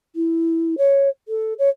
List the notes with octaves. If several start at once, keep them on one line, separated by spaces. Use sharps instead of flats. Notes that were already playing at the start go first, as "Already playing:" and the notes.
E4
C#5
A4
C#5